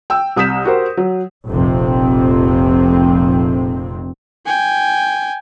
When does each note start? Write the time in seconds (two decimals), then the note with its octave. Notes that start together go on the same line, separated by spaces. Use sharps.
0.10 G5 E6
0.36 C2 D#6 G6 B6 E7
0.65 F#4 G4 A#4 C5
0.97 F#3
1.48 F1 A#1 F2 C3 C4
4.46 G5 G#5